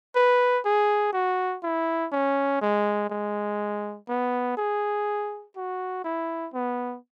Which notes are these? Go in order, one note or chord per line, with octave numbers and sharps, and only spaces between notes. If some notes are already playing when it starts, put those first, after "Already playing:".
B4
G#4
F#4
E4
C#4
G#3
G#3
B3
G#4
F#4
E4
B3